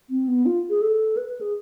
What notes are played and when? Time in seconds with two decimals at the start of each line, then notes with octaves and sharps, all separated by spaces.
0.10 C4
0.28 B3
0.46 F4
0.70 G#4
0.81 A4
1.17 B4
1.29 B4
1.41 G#4